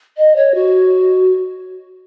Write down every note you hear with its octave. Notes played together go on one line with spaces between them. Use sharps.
D#5
C#5
F#4